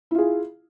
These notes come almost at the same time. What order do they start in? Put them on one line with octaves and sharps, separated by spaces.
E4 F4 G#4